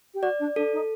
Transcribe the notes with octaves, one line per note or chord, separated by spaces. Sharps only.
G4
F#4 D5
D4
D4 A4
D#4